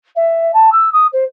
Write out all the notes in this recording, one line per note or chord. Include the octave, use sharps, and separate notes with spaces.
E5
A5
E6
D#6
C5